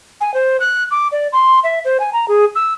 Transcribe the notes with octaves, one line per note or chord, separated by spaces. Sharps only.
G#5
C5
F#6
D6
D5
C6
E5
C5
G#5
A#5
G#4
E6